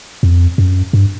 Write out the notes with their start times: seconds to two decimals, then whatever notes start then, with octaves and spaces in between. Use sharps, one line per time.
0.23 F2
0.58 F#2
0.93 G2